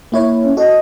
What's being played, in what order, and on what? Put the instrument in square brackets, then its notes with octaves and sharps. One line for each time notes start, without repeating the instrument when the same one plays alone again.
[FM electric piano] A#3 E4 C#5
[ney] C#4
[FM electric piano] F#4 A4 [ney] D#5